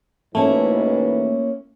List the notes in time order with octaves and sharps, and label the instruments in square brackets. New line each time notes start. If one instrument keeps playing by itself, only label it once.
[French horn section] G#2 B2 E3 [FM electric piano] A3 [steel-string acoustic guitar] A#3 C#4 E4